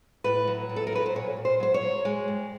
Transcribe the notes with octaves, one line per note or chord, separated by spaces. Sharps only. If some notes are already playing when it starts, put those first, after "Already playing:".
A2 B4
F#3
A2
A4
A#4
F#3 B4
C5
A#2 C#5
A#2
C5
F#3 C5
C#5
F#3
G#3
G2